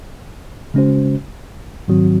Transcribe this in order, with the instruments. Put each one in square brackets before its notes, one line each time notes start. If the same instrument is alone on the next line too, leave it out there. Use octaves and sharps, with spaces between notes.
[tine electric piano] C#3 G#3 C#4 F#4 C5
G#2 D#3 F#3 C4 F#4